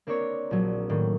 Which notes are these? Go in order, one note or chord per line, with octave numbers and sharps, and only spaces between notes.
A#3 C4 D4 A#4 C#5
A#1 F#3
A2 D#3 A#3